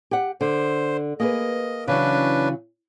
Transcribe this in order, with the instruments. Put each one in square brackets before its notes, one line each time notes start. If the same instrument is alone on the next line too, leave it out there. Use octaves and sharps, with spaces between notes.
[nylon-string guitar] G4 F#5
[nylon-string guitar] D3 [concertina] C5
[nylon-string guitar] A#3 G#4 B4 [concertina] D#5
[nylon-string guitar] C#3 E3 F#3 [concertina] C#4 D4 B4